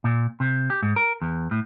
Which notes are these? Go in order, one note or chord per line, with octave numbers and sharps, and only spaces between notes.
A#2
C3
G4
G#2
A#4
E2
A2